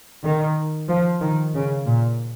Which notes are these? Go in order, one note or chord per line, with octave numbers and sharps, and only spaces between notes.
D#3
F3
D#3
C#3
A#2